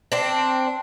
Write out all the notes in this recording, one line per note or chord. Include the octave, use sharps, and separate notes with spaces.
C4 D4